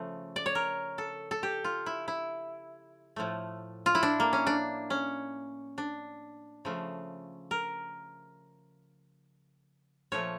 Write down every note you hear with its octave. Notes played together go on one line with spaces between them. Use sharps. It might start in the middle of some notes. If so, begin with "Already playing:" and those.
Already playing: C#3 F3 A3
D5
C#5
A#4
A4
A4
G4
F4
E4
E4
A2 F3 A3
F4
E4
D4
A#3
C#4
D4
C#4
D4
C#3 F3 A3
A#4
A#2 F3 A3 C#5